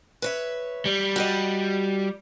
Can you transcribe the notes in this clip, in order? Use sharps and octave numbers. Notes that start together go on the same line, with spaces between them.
B4 C#5 E5
G3
F#4 G4 D#5